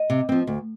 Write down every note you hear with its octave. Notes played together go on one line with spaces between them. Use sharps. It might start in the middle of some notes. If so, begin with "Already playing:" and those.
Already playing: D#5
C3
F3 C4
D2